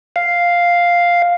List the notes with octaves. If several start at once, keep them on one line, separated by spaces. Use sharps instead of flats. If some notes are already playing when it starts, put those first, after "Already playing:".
F5